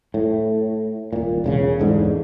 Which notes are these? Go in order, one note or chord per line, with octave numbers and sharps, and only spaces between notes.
A2
D#1 A#2
E1 G#2 C#3
E2 G#2 D3